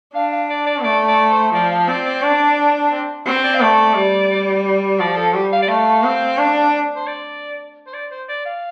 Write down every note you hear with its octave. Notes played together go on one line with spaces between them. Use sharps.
D4 F5
F5
D5
D5
A3 D5
D5
C5
F3 D5
F5
C4 D5
D5
D4 D5
C4
C4 C5
D5
F5
A3 D5
G3
F3 D5
A4
G3 G4
F5
D5
A3 F5
C4
D4
C5
D5
C5
D5
C5
D5
F5